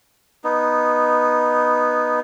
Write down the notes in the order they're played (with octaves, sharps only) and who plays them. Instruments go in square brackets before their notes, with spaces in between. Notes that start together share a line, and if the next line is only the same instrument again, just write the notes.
[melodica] B3 D#4